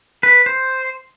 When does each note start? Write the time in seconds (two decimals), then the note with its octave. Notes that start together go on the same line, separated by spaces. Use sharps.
0.23 B4
0.46 C5